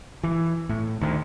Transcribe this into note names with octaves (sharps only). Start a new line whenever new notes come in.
E3
A2
D2 D#3